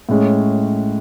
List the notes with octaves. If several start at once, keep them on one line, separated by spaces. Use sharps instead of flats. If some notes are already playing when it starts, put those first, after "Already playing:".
A2 G#3 C#4